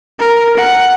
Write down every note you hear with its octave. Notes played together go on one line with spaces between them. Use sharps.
A#4
F#5